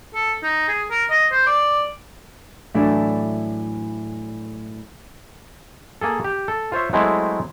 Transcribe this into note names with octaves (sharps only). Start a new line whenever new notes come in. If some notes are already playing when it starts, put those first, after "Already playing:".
A4
D#4
G#4
A#4
D#5
C5
D5
A2 E3 F#3 A3 D4
A#3 G#4 A4
G4
A4
F4 C5 C#5 E5
F#3 G#3 A3 C4 E4